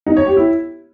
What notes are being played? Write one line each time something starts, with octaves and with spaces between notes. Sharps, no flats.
D#4
C#5
G4
E4